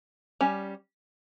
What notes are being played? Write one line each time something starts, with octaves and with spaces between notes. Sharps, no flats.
G3 C#4